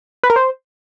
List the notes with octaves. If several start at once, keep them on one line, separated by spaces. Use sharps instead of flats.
B4
A#4
C5